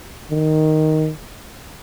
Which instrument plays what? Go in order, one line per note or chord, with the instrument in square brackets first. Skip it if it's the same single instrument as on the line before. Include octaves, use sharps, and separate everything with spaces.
[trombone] D#3